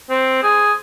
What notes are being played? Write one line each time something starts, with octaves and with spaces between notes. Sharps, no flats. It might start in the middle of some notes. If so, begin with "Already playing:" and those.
C4
G#4